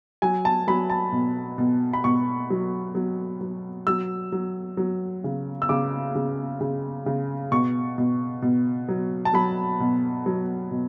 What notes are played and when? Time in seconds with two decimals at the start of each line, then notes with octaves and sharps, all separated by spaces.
0.22 F#3 G#5
0.45 A5
0.67 F#3 B5
0.90 A5
1.12 B2
1.58 B2
1.93 B5
2.04 B2 C#6
2.50 F#3
2.95 F#3
3.41 F#3
3.87 F#3 E6
4.32 F#3
4.77 F#3
5.24 C#3
5.62 E6
5.69 C#3 D6
6.15 C#3
6.61 C#3
7.06 C#3
7.52 B2 C#6
7.98 B2
8.42 B2
8.89 F#3
9.25 A5
9.34 F#3 B5
9.80 B2
10.26 F#3
10.71 B2